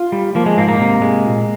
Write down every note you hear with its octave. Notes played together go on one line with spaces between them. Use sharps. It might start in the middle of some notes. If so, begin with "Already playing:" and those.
Already playing: F4
G3
F3 A#3
G#3
G#2 A#3
A#3
C3
G#3
A#2